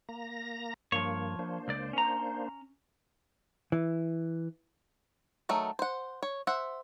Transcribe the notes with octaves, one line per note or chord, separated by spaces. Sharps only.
A#3 A#5 A#6
G2 F3 A#3 C#5
A#3 D4 C5
C#2 D5
C#4 A#5
E3
D#3 F#3 A3
C5 F#5
C#5
C5 E5 F#5